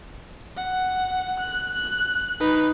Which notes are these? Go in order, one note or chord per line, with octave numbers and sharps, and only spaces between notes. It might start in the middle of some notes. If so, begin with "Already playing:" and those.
F#5
F#6
F#6
D#4 B4